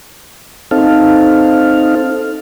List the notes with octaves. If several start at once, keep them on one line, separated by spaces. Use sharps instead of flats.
C4 D#4 A4 F5